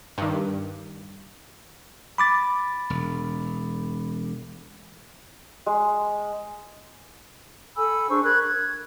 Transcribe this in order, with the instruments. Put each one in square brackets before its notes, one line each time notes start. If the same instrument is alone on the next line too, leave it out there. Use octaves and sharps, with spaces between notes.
[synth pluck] G2 D#3
[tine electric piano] B5 D6 A6
[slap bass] E1
[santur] G#3
[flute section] A4 G#5 B5 E6
D4 G#4 C5 C#6
A#4 B5 F#6 G#6
G#6